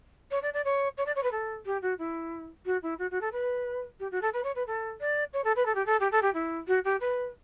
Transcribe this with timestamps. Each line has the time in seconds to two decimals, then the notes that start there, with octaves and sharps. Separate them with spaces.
0.31 C#5
0.42 D5
0.54 D5
0.65 C#5
0.98 C#5
1.06 D5
1.16 C#5
1.23 B4
1.32 A4
1.66 G4
1.82 F#4
1.99 E4
2.66 F#4
2.83 E4
2.99 F#4
3.11 F#4
3.21 A4
3.32 B4
4.00 G4
4.11 F#4
4.22 A4
4.33 B4
4.44 C#5
4.56 B4
4.67 A4
5.01 D5
5.33 C#5
5.44 A4
5.56 B4
5.66 A4
5.75 G4
5.86 A4
6.00 G4
6.12 A4
6.22 G4
6.34 E4
6.68 F#4
6.85 G4
7.01 B4